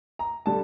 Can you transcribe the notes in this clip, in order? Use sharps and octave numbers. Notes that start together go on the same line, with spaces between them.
A#5
D3 G3 A5